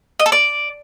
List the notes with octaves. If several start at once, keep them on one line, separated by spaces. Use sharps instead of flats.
D#5
A4
D5